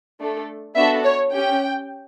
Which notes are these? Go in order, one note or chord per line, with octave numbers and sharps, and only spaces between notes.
A3 D4 A4
B3 D4 F#4 A4 E5
C#5
C#4 G4 G5